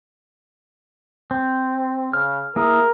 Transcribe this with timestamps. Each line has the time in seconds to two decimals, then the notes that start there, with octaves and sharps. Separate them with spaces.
1.31 C4
2.13 C#3 F6
2.56 A#3 E4 G#4 A#4